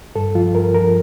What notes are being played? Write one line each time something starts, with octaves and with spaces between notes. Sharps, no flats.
G2 A4
F3 F4
G2 A#4
F3 A#4